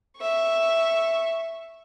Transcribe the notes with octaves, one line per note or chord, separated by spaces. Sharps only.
E5 C#6